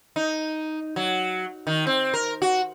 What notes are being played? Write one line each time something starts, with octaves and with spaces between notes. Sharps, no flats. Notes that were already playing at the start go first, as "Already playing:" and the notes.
D#4
F#3
D#3
C4
A#4
F#4